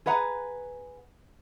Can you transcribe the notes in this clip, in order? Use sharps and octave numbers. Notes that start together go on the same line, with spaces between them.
G#4 B4 F#5 A#5